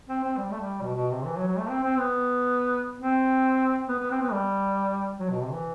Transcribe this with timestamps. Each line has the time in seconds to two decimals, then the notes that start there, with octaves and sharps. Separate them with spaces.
0.09 C4
0.23 C4
0.38 G3
0.51 A3
0.60 G3
0.82 B2
0.96 B2
1.11 C3
1.25 E3
1.37 F#3
1.48 F#3
1.58 A3
1.70 C4
1.83 C4
1.99 B3
3.00 C4
3.89 B3
3.99 B3
4.11 C4
4.21 B3
4.32 G3
5.19 F#3
5.31 B2
5.42 C3
5.52 E3